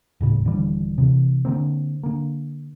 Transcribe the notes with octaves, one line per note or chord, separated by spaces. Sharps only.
D#1 A2 C#3
D#1 D3 E3 G3
C3 E3
D3 F3 A#3 C4
D3 A#3